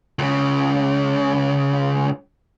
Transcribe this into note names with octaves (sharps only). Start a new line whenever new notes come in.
C#2 C#3